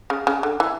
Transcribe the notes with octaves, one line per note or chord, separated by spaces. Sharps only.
C#3
C#3
D3
E3